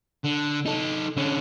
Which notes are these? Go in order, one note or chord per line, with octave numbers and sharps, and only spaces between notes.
D3
D#4 A4
D3 C#4